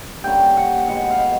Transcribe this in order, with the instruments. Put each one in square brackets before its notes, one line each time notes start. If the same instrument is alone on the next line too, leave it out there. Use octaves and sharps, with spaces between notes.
[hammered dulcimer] D3 G3 A#3 C#4 G5
F#5
B2 G#3 B3 F#5
F5